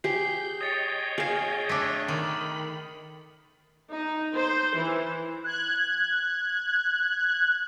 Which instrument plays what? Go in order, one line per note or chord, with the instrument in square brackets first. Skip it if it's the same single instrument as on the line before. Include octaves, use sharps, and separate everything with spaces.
[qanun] G4 G#4 [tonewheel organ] G6 [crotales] C7
[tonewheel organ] C#5 D#5 G5 [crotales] D#6 A6 C#7
[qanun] G#4 F5
[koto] A3 D4
[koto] D#3 [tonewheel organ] B5
[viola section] D#4
C5
E3
[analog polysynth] F#6 G#6